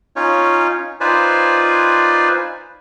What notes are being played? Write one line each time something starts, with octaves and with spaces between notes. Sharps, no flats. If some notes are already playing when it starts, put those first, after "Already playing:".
C#4 D#4 F4 C#5
D#4 F4 B4 C5 D5 G#5